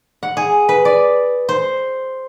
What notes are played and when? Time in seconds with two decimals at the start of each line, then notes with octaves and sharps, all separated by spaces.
0.23 F#5
0.37 G#4
0.69 B4
0.85 D5
1.49 C5